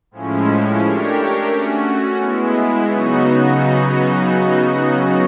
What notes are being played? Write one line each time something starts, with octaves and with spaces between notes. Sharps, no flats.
A2 F3 G#3 C#4 E4
A3 D4 G4 A#4 C#5
A3 C#4 F#4
G#3 B3 E4
C#3 F#3 B3 D#4 F#4